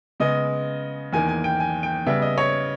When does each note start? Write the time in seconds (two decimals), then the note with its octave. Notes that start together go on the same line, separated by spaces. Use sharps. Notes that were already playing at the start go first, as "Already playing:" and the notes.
0.20 C#3 G#3 B3 D#5
1.13 E2 D#3 A#3 G#5
1.29 G#5
1.44 G5
1.60 G#5
1.83 G5
2.07 C#3 G3 B3 E5
2.22 D#5
2.38 C#5